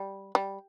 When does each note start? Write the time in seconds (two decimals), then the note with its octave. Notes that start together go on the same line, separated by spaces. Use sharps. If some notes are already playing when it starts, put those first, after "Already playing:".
Already playing: G3
0.35 G3